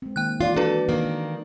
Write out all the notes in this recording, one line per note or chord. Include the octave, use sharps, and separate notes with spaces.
G#3 C4
D#3 A#3 G5 F#6
E3 F4 D5
D4 F#4 A4 B4
D#3 A#3